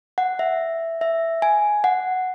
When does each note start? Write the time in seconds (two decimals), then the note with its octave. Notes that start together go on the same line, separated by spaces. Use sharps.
0.18 F#5
0.39 E5
1.01 E5
1.42 G#5
1.84 F#5